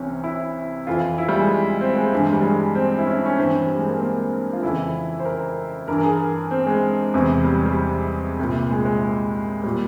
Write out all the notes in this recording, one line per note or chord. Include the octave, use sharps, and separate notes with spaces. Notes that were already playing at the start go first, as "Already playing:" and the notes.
Already playing: C2 C3 E3 C#4
E4
F2 E3 F4
E4
G3
G#3
C4
G#3
G2 E3
G3
G#3
C4
E4
C#4
C#4
G2 E3 C4
G3
G#3
A#3
C4
F4
F2 C#3 E3 E4
C5
A#4
G2 E3 A#4
A#4
G#4
C4
G#3
E2 C3 E3
G3
G3
C2 A#2
G#3
G#3
A#2 G3